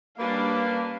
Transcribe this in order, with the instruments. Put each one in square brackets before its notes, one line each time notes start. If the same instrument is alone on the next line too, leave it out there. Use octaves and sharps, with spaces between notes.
[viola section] G3 C#4 D4 [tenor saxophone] A#3 [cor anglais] B4 [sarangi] F5